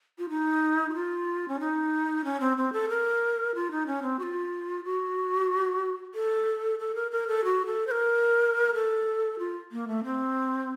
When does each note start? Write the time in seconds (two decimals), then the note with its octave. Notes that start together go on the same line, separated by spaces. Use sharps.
0.19 F4
0.29 D#4
0.90 F#4
0.94 F4
1.48 C#4
1.60 D#4
2.25 C#4
2.40 C4
2.57 C4
2.73 A4
2.89 A#4
3.55 F4
3.71 D#4
3.87 C#4
4.03 C4
4.19 F#4
4.23 F4
4.84 F#4
6.15 A4
6.79 A4
6.95 A#4
7.11 A#4
7.28 A4
7.45 F#4
7.66 A4
7.87 C5
7.91 A#4
8.75 A4
9.39 F4
9.72 A#3
9.88 A3
10.04 C4